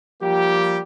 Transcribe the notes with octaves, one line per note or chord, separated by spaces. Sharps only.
F3 G3 A#3 G4